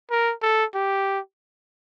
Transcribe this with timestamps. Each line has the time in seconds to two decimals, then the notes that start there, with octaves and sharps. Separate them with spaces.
0.11 A#4
0.42 A4
0.74 G4